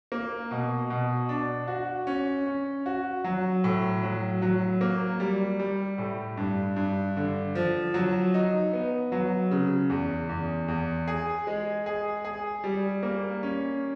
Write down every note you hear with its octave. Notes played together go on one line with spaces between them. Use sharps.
A#3
B2
B2
D4
F#4
C#4
C#4
F#4
F#3
A2
F#3
F#3
A#3
G3
G3
A2
G2
G2
D3
F3
F#3
D#4
B3
F#3
C#3
E2
E2
E2
G#4
G#3
G#4
G#4
G3
A#3
C#4